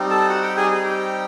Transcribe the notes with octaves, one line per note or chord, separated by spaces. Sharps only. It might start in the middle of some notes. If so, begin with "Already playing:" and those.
Already playing: G3 C4 D#4
A4 A5
F#4 F#5
G4 G5
G#4 G#5
G#4 G#5
G4 G5